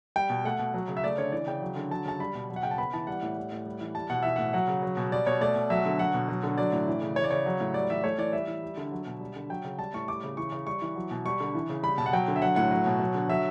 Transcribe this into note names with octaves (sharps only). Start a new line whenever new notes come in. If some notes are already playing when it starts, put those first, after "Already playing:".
G3 G5
B2
A3 F#5
B2
F#3
C#3
E5
A3 D5
D3 C#5
E3 D5
C#3 G5
F#3
D3
F#3 A5
C#3 A5
G3 B5
B2
F#3
F#5
C#3 G5
A5
B3 B5
E3 A5
G3 F#5
A2
G3
A2
G3
E3
G3 A5
B2 F#5
E3 E5
A2 F#5
F#3 F#5
C#3
F#3
B2
G3 D5
B2 C#5
A3 D5
B2
F#3 E5
D3
F#3 F#5
B2
F#3
D3
F#3 D5
A2
E3
C#3
E3 C#5
D5
C#3 C#5
F#3
A2
G3 D5
E3 E5
A3 C#5
E3 D5
G3 E5
E3
G3
D3
F#3
B2
G3
D3
F#3 G5
C#3
G3 A5
A2 C#6
G3 D6
C#3
E3 C#6
C#3
G3 C#6
E3
F#3
B2
G3 C#6
D3
E3
C#3
G3 B5
B2 A5
F#5
F#3 G5
D3
E5
F#3 F#5
A2 F#5
F#3
B2
F#3
D3
F#3 E5